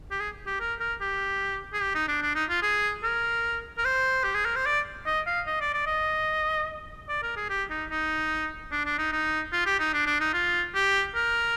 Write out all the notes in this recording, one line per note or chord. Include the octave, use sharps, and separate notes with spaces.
G4
G#4
G4
A#4
A#4
G4
G#4
G4
D#4
D4
D4
D#4
F4
G#4
A#4
A#4
C5
G4
G#4
A#4
C5
D5
D#5
F5
D#5
D5
D5
D#5
D5
A#4
G#4
G4
D#4
D#4
D4
D4
D#4
D#4
F4
G4
D#4
D4
D4
D#4
F4
G4
A#4